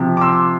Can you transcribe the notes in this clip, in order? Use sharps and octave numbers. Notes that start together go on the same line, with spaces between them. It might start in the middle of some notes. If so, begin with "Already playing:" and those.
Already playing: C3 F3
D6
C6 E6